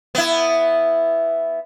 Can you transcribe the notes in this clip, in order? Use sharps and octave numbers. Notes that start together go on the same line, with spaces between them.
B3 E4